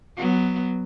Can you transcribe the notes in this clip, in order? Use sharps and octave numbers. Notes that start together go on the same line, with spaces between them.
F#3 B3